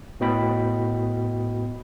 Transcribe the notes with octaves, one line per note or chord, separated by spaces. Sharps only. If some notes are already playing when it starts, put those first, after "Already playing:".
A2 B3 F#4 D#5 G5 B5